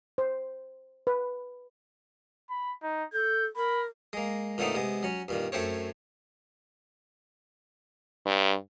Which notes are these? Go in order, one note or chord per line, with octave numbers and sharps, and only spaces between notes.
C5
B4
B5
D#4
A4 G6
A#4 B5
G#3 A#3
A#2 D3 A3 B3 C4 D#4
C3 G#3 B3
F#3 C#4
G2 A#2 D#3
F#2 A3 C4 C5 C#5
G2